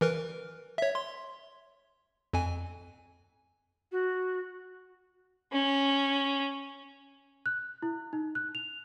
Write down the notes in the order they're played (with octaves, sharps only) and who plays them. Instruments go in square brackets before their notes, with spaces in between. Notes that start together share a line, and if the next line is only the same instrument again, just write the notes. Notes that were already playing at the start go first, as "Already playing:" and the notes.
[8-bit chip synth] E3 A#4 B4
C#5 E5
C6
F2 G#5
[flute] F#4
[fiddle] C#4
[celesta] F#6
E4
D#4
F#6
F7